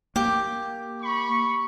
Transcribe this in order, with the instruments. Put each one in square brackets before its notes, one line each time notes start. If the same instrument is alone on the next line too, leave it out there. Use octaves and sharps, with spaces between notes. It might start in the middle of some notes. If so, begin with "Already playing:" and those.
[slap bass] A#3 [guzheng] G4
[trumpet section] B5 C#6